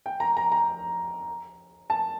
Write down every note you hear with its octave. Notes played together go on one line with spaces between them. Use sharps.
G5
A#5
A#5
A#5
A5